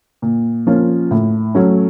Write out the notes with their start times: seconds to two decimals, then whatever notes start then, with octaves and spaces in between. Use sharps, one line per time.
0.22 A#2
0.67 F3 A#3 C#4 F4
1.11 A2
1.55 F#3 A3 C#4